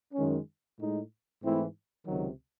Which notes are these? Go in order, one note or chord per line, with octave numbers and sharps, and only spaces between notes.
F#2 D#3 G#3 C#4
A2 G#3 D#4
G#2 E3 A3 C4 E4
C#2 C3 D#3 F#3